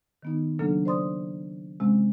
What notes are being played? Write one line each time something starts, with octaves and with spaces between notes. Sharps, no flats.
D#3 B3 D#4
C#3 F#3 A#3 D4 A4
C5 D5 C6 D#6
C3 G#3 C4 C#4